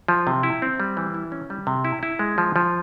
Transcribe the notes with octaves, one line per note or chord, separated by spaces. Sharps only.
F3
C3
E4
C4
G3
E3
E4
C#4
G3
C3
E4
E4
G#3
F3
F3